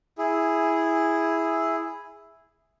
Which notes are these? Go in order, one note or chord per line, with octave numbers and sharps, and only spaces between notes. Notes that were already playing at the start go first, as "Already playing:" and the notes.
E4 G#4